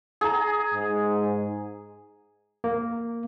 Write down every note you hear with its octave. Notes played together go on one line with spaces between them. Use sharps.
G#4 A#5
G#2
A#3